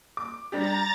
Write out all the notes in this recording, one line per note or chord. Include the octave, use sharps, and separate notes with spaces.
D6
G3 D4 G4 A#5 A6